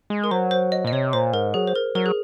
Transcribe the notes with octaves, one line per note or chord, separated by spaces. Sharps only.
G#3
A#4
F#3 C5
C5
D#5
A#2 D#5
C3 C#5
A#2 C5
G#2 A#4
F#3 G#4
C5
A#4
F#3 A#4
G#4